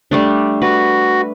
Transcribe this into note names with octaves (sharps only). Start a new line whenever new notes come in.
G3 A3 D4
F#4 B4